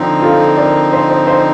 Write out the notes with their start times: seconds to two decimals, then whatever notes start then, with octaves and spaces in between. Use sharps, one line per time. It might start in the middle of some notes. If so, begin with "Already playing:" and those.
Already playing: D3 F3 C4 D#4
0.22 F4 A4
0.57 A#4 D5
0.93 C5 D#5
1.09 C5 D#5
1.27 C5 D#5